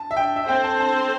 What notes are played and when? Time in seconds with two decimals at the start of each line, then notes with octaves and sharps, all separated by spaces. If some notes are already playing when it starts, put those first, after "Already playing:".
Already playing: A5
0.11 E5
0.17 G5
0.36 E5
0.48 C4 A4 C5 G5
0.64 A5
0.80 A5